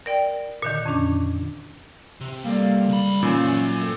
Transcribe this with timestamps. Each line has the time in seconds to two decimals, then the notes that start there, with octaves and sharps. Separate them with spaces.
0.06 A#4 D5 G5
0.62 A#2 D3 D#3
0.86 F2 C#4 D4 D6
2.20 C3
2.45 G3 A#3 A4 D5
2.89 C#2 B5
3.23 A#2 D#3 E3 C#4 D#4 F5
3.43 F#2 F#3
3.80 A3 C4 A4